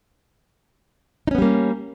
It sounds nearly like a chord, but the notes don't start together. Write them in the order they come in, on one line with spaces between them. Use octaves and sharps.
D#4 C#4 B3 G3 A#3